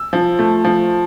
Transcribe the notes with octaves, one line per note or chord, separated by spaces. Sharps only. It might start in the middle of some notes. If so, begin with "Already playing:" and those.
Already playing: E6
F3
A3
F3